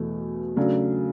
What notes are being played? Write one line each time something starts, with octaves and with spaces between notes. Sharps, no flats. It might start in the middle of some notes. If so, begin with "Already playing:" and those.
Already playing: E2 B2 A3
C#3 F#3 A3 D4